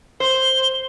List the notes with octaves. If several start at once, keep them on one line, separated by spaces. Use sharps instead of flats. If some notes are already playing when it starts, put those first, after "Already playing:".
C5 G7